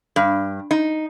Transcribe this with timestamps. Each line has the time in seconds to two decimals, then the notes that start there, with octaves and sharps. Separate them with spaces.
0.16 G2
0.71 D#4